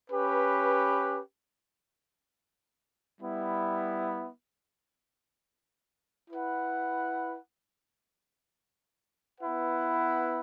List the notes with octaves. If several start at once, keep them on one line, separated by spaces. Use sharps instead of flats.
C#4 G4 B4
G3 B3 E4
E4 B4 F#5
B3 E4 B4 F#5